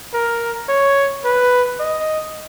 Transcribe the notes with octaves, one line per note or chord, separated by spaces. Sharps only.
A#4
C#5
B4
D#5